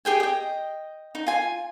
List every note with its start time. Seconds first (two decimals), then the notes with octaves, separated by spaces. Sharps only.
0.05 G4 G#4 G5 G#5
0.20 D#5 G5
1.15 D#4
1.27 F4 G#5